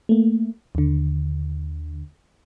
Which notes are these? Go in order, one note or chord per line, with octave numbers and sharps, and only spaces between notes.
A3 A#3
D#2 D3